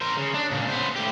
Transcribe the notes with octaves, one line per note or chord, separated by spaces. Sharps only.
A#4 C5
C#3
D4
A#2 C#3
B3 C5
A2 G4